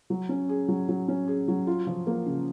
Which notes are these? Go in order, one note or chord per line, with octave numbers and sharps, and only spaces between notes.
F#3
C#4
G#4
F#3
F#3
C#4
G#4
F#3
F4
F3
A#3
C#3